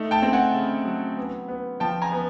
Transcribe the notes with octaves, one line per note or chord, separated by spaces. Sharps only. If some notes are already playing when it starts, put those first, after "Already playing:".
Already playing: A3 D#4
G5 A5
C4
F#5 G#5
C#3
F#3
B3
B3
F3 G5 A5
G#5 A#5
B3